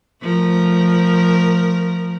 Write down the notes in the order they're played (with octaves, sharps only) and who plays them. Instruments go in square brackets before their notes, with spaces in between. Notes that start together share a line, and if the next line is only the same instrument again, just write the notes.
[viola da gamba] F3 A3 A#4